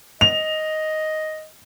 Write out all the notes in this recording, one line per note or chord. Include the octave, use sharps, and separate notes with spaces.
D#5 F7